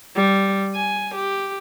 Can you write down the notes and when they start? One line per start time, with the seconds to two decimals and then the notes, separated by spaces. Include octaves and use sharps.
0.16 G3
0.75 G#5
1.15 G4